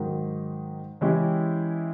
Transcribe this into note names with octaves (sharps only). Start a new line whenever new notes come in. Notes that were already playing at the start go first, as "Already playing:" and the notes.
Already playing: G#2 D#3 F#3
E3 G#3 C#4 E4 G4